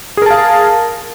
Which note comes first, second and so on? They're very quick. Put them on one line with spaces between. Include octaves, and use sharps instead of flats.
G#4 A#4 A5 F5